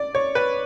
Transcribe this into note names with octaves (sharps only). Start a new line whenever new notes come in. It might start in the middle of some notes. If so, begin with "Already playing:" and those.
Already playing: D5
C#5
B4